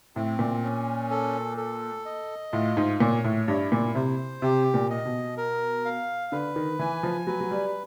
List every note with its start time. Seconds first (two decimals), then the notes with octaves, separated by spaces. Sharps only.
0.16 A2 C4
0.39 A#2
0.63 C#4
1.11 A4
1.57 A4
2.05 D#5
2.53 A2 F4
2.77 G#2
3.00 A#2 C#5
3.24 A2
3.47 G2 E4
3.72 A#2
3.95 C3 C5
4.42 C3 G4
4.74 A#2
4.90 D#5
5.06 B2
5.37 A#4
5.85 F5
6.32 D3 B4
6.56 D#3
6.79 E3 G#5
7.03 F3
7.27 F#3 B4
7.40 F#3
7.51 G3